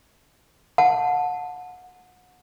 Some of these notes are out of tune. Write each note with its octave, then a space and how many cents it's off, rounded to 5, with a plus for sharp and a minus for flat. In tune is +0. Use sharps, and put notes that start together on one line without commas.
F#5 -25 A5 +0